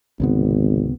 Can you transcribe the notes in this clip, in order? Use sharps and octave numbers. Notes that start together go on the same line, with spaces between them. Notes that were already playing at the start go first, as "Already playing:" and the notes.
G#1 C#2 C3 B3